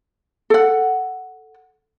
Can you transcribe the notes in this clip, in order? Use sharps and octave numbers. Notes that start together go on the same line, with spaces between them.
A4 F#5